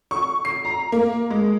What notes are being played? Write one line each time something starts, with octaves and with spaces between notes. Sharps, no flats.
C#6
C7
A#5
A#3
G#3